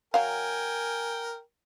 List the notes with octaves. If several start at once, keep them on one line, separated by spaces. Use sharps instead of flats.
F#3 A#4 F5 G5 G#5